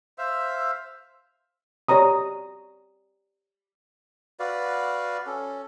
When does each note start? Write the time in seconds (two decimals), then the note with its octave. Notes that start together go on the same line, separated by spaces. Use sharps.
0.18 C5 E5 F5 E6
1.89 G4 C#5 D5 A#5 D#6
4.39 F#4 B4 D5 F5
5.26 C#4 A4